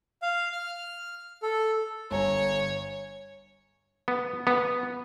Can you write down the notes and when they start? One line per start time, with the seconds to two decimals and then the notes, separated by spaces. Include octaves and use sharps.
0.22 F5
0.52 F6
1.43 A4
2.11 G1 C#5 G#5 A#5
4.08 B3
4.47 B3